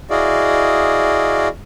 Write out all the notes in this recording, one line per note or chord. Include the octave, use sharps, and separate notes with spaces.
E4 F#4 G#4 D5 D#5 F5